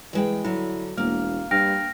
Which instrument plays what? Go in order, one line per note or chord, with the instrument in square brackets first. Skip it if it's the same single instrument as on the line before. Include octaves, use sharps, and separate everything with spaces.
[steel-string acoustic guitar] E3 G#3 G5
[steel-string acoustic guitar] D3 F#3 [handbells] E4
[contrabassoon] E1 [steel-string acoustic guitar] A#3 [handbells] F6
[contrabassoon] G2 [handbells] G5 F6 [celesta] A#6